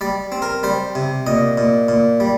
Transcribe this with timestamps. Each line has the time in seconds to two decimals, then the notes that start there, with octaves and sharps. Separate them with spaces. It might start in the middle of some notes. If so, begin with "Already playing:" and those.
0.01 G3 D5
0.32 C4
0.42 A#4
0.63 G3 C5
0.95 C3
1.27 A#2 D#5
1.58 A#2
1.88 A#2
2.20 G3